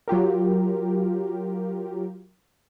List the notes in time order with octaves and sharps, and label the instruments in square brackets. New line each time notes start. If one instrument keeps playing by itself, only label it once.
[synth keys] F#3 F4 G4 A#4